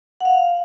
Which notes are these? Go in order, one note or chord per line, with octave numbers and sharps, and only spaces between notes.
F#5
F5